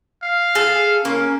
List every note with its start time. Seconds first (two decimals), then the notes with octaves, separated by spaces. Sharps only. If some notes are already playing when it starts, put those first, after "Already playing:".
0.23 F5
0.55 G#4 A4
1.05 A#3 C#4